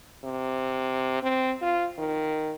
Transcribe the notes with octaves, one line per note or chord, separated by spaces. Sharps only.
C3
C4
F4
D#3